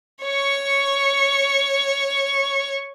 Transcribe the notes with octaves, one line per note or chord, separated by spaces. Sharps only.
C#5 C#6